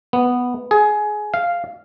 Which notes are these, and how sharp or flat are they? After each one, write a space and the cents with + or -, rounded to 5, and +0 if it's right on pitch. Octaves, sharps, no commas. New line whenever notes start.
B3 +0
G#4 +15
F5 -5